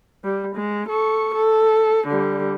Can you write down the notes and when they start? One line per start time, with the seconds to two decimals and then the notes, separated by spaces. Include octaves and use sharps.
0.24 G3
0.56 G#3
0.89 A4 C#6
1.35 A4
2.08 D3 G3